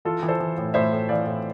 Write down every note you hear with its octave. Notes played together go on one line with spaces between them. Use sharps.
E3 F4 A4
E3
A4 C5
E3
A2
A2 C5 E5
A2
E3 D5 F5
A2